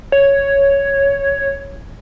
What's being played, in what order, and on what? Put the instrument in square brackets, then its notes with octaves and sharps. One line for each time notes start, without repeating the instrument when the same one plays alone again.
[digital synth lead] C#5